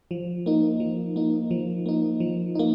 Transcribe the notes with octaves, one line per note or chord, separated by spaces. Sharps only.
F3
A#3 D#4
F3
A#3 D#4
F3
A#3 D#4
F3
A#3 D#4